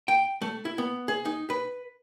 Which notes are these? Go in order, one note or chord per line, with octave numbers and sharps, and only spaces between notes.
G5
A3
E4
B3
G#4
D#4
B4